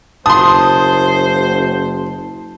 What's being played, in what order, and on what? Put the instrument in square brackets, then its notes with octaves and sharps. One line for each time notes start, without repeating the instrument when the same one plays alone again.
[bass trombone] F#1 [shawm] C5 [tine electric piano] A5 [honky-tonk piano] C6 D#6